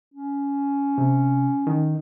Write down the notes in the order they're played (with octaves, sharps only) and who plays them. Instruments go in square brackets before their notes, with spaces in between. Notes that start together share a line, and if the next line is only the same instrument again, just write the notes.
[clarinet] C#4
[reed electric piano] C3
D#3